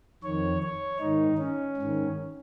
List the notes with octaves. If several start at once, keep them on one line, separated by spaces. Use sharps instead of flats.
F2 D#3 C#5
C#5
G#2 D#3 D#4
C#4
G#2 D#3